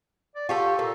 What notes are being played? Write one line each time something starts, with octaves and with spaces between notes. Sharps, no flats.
D5
F4 G4 A4 C#6
A#2 A4